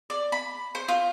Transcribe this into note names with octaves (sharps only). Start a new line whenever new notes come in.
D5
B5
C5
F4